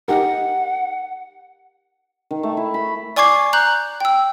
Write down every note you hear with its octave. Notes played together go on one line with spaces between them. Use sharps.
D#4 G4 A#4 F#5
D#3
A3
E4
B5
D5 G#5 C#6 D6 G#6 C7
A#5 F#6 G6 F#7
G5 E6